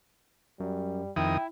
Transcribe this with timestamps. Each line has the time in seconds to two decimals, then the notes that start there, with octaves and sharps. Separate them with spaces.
0.60 F#2 G3
1.16 F2 D#3 E4 G5 D#6